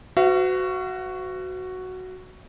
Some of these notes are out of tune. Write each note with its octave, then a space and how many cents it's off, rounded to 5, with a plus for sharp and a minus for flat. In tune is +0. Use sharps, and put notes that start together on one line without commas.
F#4 +0 B4 +45 F5 -45